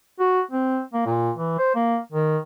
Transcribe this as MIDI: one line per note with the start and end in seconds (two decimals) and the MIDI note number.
0.20 0.42 66
0.51 0.81 60
0.94 1.05 58
1.06 1.31 46
1.37 1.56 52
1.59 1.75 72
1.76 1.98 58
2.12 2.38 51